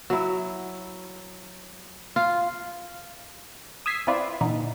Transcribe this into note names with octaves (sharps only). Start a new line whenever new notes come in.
F#3 E4
F4
D#6 E6 G#6 B6 C7
C4 E4 F4 B4 D5
A#2 D3 E3 D#4